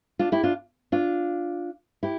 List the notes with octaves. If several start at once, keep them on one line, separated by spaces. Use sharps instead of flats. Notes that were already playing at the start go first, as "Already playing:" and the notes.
D4 F4
E4 G4
D4 F4
D4 F4
E4 G4